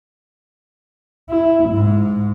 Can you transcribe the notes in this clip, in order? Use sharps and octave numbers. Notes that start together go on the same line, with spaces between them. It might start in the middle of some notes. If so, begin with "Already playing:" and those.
E4
G#2